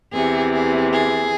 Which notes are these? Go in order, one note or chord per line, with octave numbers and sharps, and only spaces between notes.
E2 C3 E3 G#4
G#4
G#4